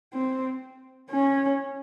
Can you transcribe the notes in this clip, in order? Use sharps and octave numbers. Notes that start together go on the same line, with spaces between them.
C4
C#4